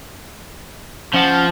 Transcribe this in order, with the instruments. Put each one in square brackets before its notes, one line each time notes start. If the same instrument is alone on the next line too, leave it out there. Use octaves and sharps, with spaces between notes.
[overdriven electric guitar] F3 [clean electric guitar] C#4 F#5 A5